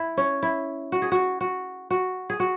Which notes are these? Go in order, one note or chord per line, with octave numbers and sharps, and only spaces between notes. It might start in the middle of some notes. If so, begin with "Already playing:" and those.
Already playing: E4
C#4
E4
F#4
G#4
F#4
F#4
F#4
G#4
F#4